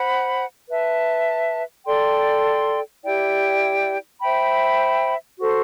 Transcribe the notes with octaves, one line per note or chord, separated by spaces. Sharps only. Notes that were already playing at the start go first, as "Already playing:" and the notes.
Already playing: C5 F#5 B5
B4 E5 A5
A4 D5 G5 C6
E4 G4 D5 G5
C5 E5 G5 B5
F#4 A4 C5